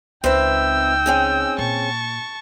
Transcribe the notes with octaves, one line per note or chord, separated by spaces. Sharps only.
C#2 C4 D#4 B4 E5 G5 E6
C4 C#4 G#4
A#2 A5 C#6